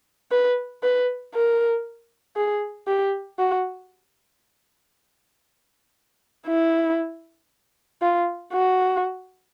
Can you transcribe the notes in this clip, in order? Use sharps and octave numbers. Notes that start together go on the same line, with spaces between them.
B4
B4
A#4
G#4
G4
F#4
E4
F4
F#4